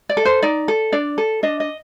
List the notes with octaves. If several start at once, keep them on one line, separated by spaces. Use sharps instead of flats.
D5
A4
C5
D#4 D5
A4
D4 D5
A4
D4 D#5
D#5